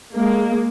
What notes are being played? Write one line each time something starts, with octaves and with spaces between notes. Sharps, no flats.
G#3 A#3